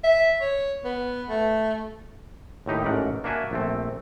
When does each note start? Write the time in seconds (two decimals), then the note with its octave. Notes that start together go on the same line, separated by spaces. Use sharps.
0.04 E5
0.41 C#5
0.85 B3
1.29 A3
2.66 D#2 A2 D#4 G4
2.84 A1 G#2 A3 A#4 F#5
3.24 A#3 D4 F#4 E5 G#5
3.51 A#1 A3 C4